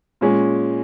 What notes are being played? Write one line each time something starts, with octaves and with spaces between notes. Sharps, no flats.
A#2 G#3 C#4